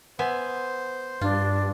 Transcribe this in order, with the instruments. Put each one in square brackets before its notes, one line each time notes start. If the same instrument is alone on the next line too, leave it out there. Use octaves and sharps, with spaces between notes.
[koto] B3 E5 G#5 [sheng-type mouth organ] C5
[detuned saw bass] G2 [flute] D4 [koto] F4